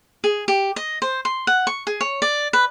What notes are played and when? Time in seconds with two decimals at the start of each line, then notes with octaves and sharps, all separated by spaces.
0.24 G#4
0.48 G4
0.76 D#5
1.02 C5
1.25 C6
1.47 F#5
1.67 C#6
1.87 G#4
2.01 C#5
2.22 D5
2.53 B4